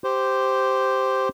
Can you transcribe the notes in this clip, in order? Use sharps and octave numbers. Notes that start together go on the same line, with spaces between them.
G4 C5